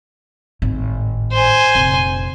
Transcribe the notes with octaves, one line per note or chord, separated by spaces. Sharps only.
G#1 A2
C5 G#5
F1 A#1